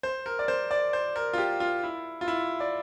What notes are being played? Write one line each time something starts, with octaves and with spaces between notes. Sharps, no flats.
C5
A#4
D5
C5
D5
C5
A#4
F4
G4
F4
E4
F4
E4
D5